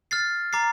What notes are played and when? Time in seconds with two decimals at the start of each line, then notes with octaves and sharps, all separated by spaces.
0.11 F6 A6 C7
0.53 A#5 D6 A6 C7